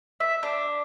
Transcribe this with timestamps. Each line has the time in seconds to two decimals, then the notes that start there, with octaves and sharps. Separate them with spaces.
0.20 E5
0.43 D4